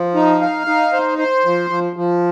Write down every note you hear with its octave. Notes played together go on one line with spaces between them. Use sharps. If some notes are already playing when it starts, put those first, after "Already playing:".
Already playing: F3
D#4
F5
D#4
C5
C5
F3
F3
F3